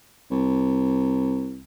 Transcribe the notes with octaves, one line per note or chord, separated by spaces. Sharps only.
C2